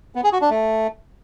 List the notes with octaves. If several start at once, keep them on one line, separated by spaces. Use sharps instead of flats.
B3
G#4
F#4
D4
A3